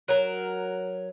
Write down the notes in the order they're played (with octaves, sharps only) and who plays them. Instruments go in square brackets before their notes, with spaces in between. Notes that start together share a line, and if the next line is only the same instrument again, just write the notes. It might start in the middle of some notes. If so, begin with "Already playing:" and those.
[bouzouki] F#3 A#4